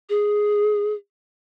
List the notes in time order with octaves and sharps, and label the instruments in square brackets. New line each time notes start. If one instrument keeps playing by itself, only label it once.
[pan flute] G#4